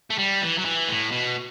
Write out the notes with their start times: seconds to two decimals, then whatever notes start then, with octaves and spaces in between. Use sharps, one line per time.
0.10 A3
0.18 G3
0.41 E3
0.58 F#3
0.65 E3
0.88 A2
1.12 B2